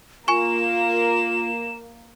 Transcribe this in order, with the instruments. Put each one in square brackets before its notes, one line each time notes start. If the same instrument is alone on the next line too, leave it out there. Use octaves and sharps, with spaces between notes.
[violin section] A#3 [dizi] F4 [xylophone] G#5 C#6 [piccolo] E7